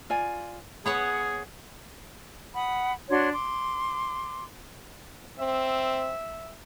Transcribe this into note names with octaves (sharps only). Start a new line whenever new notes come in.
F4 D5 G#5
B3 G#4 C#5 F#5 B5
F#5 B5 D#6
D4 F#4 C#5 C6
C6 D6
C4 E5